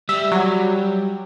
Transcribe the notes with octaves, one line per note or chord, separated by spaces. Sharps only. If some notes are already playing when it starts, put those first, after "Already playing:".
G3 E5
F#3